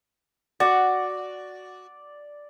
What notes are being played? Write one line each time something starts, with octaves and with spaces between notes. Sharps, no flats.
F#4 D5